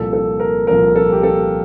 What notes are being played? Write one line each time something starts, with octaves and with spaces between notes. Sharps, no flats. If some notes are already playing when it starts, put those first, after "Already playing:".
Already playing: C2 A#2 F3 A4
A4
A#4
C2 A#2 F3 A#4
A4
G4
A4